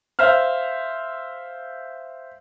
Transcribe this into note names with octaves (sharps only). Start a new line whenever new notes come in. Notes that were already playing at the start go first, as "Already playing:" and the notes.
C5 E5 F5 F6